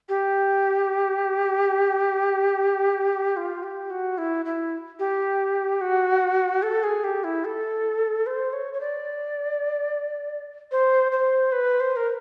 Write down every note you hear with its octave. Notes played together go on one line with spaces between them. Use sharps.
G4
F4
G4
F#4
E4
E4
G4
F#4
A4
G#4
G4
E4
A4
C5
C#5
C#5
D5
C5
C5
B4
C5
A#4